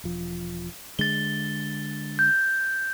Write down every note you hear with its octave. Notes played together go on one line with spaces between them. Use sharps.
E1 F3
D3 G#3 A6 G7
G6